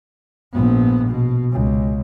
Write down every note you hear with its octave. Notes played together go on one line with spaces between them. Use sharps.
A#1 B3
B2
C#2